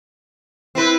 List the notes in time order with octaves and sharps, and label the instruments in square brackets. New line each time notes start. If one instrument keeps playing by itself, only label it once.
[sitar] C4 B4 [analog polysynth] E4